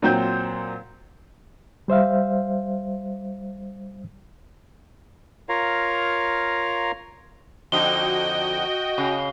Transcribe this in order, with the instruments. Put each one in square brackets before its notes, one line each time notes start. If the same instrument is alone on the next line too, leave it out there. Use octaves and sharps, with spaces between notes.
[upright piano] A#2 F#3 C4 C5 G6
[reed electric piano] G3 C5 E5 F5
[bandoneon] F4 A#4 C#5 F5 A#5
[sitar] F2 D3 D#4 [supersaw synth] F#4 D#5 G5 [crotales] G7
[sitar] C#3